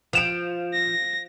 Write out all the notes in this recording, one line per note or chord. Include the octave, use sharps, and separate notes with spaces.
F3 D7 E7 F7
A#6